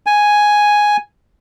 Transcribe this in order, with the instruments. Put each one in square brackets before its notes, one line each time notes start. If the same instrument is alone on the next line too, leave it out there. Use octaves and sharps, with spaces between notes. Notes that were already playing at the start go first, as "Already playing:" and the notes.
[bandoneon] G#5